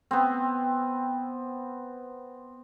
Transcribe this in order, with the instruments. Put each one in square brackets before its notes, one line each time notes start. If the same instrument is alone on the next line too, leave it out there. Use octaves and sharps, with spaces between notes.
[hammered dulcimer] B3 C4